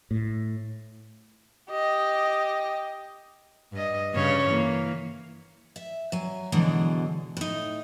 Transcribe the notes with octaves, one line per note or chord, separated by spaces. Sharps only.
A2
G4 D#5
G2 D#5
G2 C#3 C#5
E3 A#3
E5
F#3 G#5
B2 D3 E3 F#3 G#3
A2 D#4